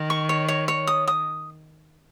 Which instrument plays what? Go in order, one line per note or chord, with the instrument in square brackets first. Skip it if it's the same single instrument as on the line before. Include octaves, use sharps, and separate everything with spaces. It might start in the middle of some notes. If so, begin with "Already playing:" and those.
Already playing: [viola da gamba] D#3
[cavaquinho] C#6
C#5
C#5
C#5
D#6
D#6